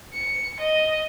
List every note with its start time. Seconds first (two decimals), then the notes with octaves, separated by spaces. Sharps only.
0.13 C#7
0.60 D#5